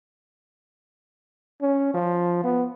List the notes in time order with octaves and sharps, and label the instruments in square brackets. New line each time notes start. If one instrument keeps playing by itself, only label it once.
[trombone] C#4
F3
B3